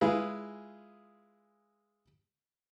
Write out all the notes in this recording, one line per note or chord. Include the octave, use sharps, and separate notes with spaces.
G#3 E4 F4 G#4 B4